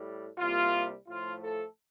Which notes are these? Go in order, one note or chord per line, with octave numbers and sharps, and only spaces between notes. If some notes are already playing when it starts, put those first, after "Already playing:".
Already playing: A2 G3
C2 C3 G3 A#3 F4
A2 F3 A3 F4
A4